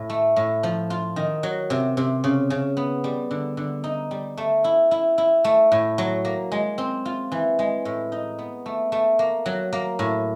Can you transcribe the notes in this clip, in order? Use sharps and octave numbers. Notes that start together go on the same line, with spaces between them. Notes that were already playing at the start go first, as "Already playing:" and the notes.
Already playing: A2
A3
A2
F3
F4
D#3
F#3
C3
C3
C#3
C#3
B3
G3
D3
D3
D#4
G3
A3
E4
E4
E4
A3
A2
F#3
A#3
G#3
C4
F4
E3
G#3
A2
D#4
B3
A3
A3
A#3
F#3
A#3
A2